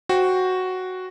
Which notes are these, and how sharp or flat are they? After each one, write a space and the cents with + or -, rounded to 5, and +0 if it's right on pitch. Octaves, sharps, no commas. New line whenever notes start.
F#4 +0 C5 +0 G5 +0